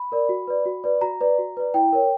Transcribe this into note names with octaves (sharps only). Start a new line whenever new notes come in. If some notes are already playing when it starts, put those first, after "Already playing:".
Already playing: B5
A#4 D5
F#4
B4 D5
F#4
B4 D5
F#4 A#5
B4 D5
F#4
B4 D5
E4 G5
A#4 C#5